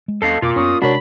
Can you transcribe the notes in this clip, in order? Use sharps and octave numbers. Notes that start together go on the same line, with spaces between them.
G#3
D#2 A#3 C#4 A4 D#5 F5 A5 C7
F2 B2 F4 A#4 D6
F#2 A3 B3 C#4 C#6 D#6
C3 G#3 D4 F#4 A#4 C#5 B5